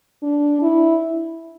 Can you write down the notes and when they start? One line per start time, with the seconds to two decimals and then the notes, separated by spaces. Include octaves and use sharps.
0.23 D4
0.62 E4